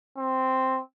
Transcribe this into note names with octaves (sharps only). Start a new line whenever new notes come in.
C4